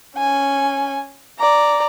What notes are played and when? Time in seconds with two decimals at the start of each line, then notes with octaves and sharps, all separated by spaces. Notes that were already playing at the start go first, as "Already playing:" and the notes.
0.17 C#4 G#5
1.39 D5 A#5